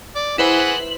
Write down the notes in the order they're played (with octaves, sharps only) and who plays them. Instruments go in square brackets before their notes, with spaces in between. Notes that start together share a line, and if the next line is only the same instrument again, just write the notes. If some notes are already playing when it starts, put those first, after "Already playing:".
[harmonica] D5
[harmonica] E3 G#4 F#5 [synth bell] E4 B4 C5
[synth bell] F#7